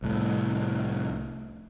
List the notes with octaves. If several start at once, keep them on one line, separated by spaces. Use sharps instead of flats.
C2 A2